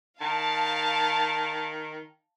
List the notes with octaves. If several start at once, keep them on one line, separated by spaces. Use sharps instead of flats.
D#3 F5 A5